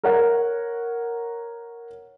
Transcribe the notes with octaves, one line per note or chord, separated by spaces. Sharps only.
A#4 C#5 F#5